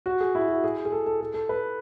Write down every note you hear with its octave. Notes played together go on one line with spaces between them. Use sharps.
F#4
G#4
E4
F#4
G#4
G#4
A4
A4
A4
A4
B4